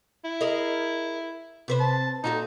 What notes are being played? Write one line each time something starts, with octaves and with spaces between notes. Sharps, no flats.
E4
G#4 A#4 D#5
C3 B4 C5
A5
A#2 D#4 F#4 A4